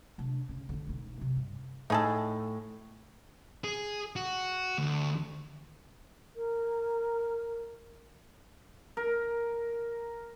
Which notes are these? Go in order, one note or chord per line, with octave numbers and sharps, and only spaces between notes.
C3 D4
C#3 C#4
D3 D#4
E1 D#4
C3
G2
A2 D#4 G#4 A4
G#4
F#4
D2
A#4
A#4